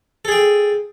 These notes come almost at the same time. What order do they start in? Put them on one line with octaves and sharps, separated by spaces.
A4 G#4 G5